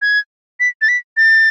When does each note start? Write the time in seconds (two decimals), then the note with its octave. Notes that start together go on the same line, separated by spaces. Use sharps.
0.02 G#6
0.60 B6
0.82 A6
0.89 B6
1.17 A6